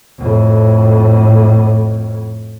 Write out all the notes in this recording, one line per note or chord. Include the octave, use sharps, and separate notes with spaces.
F2 A2